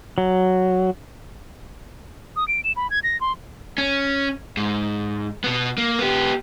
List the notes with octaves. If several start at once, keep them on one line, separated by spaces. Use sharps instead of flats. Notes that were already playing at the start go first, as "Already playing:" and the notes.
F#3
D#6
D7
E7
B5
G#6
A#6
C6
C#4
G#2
B2 B3
A#3
B3 G4